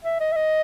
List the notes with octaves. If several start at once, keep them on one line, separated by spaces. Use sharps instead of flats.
E5
D#5
E5
D#5